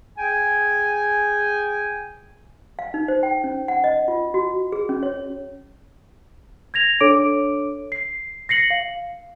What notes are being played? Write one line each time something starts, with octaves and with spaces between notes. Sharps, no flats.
G#4 G5 G#5
F5
D#4
C5
G5
C#4
F#5
D#5
F4
F#4
G#4
C#4
C#5
G#6 A#6 F7
D4 A4 C#5 D6 D7
C7
A#6 C7 C#7 F#7
F5